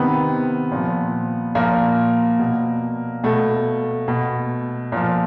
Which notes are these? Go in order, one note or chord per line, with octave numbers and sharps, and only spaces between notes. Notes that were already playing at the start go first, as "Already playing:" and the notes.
Already playing: C3 D#3 B3
A#2 F3
A#2 F3 A#3
B2
B2 A3
B2
A#2 F3